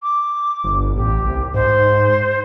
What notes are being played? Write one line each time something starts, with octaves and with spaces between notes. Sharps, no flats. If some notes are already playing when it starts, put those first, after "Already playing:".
D6
G1
A1 G4
C2
G#2 C5